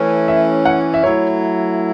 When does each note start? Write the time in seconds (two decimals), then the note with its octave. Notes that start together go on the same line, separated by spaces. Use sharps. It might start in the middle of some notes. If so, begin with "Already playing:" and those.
Already playing: E3 A3 C#4
0.28 E5
0.65 F#5
0.94 E5
1.04 F#3 A3 E4 C#5